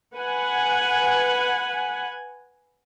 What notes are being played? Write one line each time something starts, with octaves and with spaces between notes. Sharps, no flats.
B4 F#5 G#5